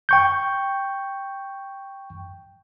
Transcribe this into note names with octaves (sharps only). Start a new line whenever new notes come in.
G5 C#6 G6